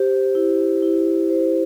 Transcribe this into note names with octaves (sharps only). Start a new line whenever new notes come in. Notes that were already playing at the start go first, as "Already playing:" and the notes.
Already playing: G4 C5
E4
E4
C5